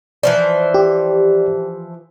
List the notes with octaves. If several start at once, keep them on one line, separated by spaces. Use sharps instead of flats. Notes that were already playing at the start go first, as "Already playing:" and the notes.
E3 F3 C5 D5
G4